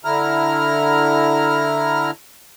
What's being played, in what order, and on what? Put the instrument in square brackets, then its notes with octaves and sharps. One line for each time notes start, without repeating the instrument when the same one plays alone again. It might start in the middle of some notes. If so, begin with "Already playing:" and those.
[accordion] D3 E4 A#5 F6